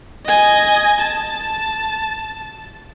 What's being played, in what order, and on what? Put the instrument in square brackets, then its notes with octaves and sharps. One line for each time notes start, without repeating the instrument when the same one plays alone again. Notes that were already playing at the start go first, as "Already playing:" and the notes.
[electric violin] D#5 G#5
A5